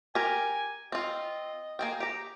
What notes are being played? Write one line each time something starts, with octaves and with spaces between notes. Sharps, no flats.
G4 A#4 G#5
C4 F4 D#5
A#3 G#4 G5
G4 A#5